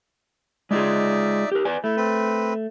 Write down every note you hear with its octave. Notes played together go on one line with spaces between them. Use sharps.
G#3 D#4 F4 G#4 D5 E5
G4 A#4
B4 D5 G#5
A3 E4
C4 B4